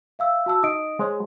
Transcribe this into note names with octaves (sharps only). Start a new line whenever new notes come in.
E5 F5 E6
F#4 A5 E6
D#4 D#5 D#6 D7
G#3 C5 C#5